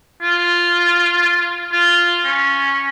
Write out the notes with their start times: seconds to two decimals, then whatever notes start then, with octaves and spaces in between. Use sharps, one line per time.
0.22 F4
1.72 F4
2.25 C#4